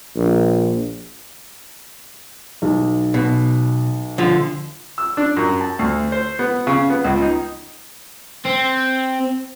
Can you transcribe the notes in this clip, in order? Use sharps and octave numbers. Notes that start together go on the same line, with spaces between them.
A#1
B1
B2
D3 F3 F4
E6
D4
F#2
A5
D2
C5
B3
C#3
B3
C#2
D#4
C4